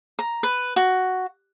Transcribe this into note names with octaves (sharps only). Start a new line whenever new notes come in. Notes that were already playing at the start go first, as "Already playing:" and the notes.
A#5
B4
F#4